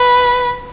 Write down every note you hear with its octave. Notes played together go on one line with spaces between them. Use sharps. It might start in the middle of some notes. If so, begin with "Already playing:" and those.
Already playing: B4